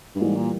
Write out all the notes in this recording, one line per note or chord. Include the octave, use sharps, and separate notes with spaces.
G2
G#2 E3 G3 A#3
A#2